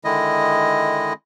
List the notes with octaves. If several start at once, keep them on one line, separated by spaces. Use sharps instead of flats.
D3 D#3 G#3 E4 D#5